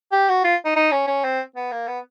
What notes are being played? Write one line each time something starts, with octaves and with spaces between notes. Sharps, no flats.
G4
F#4
F4
D#4
D#4
C#4
C#4
C4
B3
A#3
B3